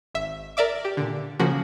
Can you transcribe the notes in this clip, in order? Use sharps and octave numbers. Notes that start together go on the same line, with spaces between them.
G#1 E5
A#4 D5 E5 D6
G4
A#2 D3
C#3 F3 A#3 F#4